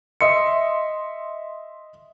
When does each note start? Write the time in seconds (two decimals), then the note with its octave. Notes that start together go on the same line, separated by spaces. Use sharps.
0.21 D#5 E5 C6 C#7